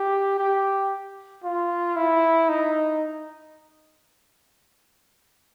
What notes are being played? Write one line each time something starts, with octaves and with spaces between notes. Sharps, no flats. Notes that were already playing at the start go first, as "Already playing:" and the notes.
Already playing: G4
G4
F4
E4
D#4